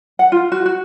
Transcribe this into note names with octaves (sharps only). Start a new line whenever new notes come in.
F#5
F4
F#4
F#4